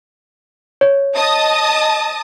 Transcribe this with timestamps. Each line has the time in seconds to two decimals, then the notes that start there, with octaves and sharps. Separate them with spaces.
0.81 C#5
1.15 D#5 A5 D#6